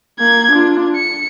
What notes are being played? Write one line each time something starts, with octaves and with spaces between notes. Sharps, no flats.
A#3 G#6
D4 F4
C#7